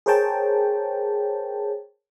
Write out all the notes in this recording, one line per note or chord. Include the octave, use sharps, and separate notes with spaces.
G#4 A#4 C5 C#5 G5 A5